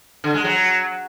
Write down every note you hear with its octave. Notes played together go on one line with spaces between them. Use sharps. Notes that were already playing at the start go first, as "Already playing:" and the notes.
D3
G#3
F#3